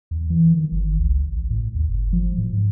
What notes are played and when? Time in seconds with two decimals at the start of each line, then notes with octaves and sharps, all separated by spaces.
0.11 E2
0.30 E3
0.54 D#3
0.72 G1
0.98 C#2
1.32 A1
1.50 A2
1.75 D#2
1.89 G1
2.13 F3
2.38 A2
2.53 G#2